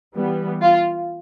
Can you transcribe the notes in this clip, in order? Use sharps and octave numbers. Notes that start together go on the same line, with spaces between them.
E3 G3 B3
F4